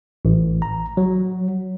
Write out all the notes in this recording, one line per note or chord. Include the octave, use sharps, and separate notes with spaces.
A1
A#5
F#3